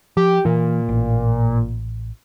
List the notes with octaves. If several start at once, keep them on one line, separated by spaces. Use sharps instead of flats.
F3 G4
A#2 E3
A1